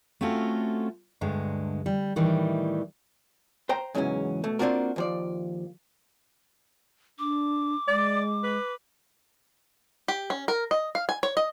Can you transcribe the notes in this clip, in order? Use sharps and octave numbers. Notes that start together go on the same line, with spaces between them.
A3 C4 C#4 F4 F#4 A4
D2 G2 D3 G#3
G3
A2 D#3 E3 G3
C5 G5 A#5
E2 G#2 C#3 E3 F#3 C#4
B2 A3
A#3 C4 D4 F4 F#4 A#4
D#2 F3 D5
D4 D6
G#3 D5
B4
G4
C#4
A#4
D#5
F5
G#5
C#5
D#5